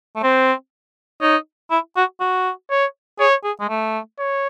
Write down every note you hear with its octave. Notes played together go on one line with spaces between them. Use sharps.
A3
C4 C5
D#4 C#5
E4
F#4
F#4
C#5
G#4 C#5
G#4
G#3
A3
C#5